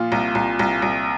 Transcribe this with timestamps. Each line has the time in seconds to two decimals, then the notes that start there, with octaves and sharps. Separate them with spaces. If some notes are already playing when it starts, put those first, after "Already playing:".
Already playing: A#2 F3 F4
0.12 C2
0.35 C2
0.59 C2
0.82 C2